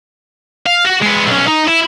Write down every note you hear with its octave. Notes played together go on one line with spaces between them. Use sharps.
F5
F#4
G#3 B3
B1 C#4
D#4
E4